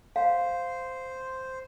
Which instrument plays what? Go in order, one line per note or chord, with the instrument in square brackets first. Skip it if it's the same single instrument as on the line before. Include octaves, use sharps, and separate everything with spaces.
[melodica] C5 [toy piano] F5